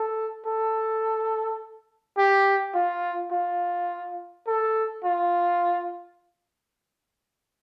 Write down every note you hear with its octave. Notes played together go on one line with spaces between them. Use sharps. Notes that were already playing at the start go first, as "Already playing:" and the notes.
Already playing: A4
A4
G4
F4
F4
A4
F4